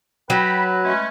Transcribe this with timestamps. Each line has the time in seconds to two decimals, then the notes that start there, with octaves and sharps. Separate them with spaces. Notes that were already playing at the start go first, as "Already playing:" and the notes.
0.30 F#3 B4 G5 B5
0.84 G#3 A3 C#4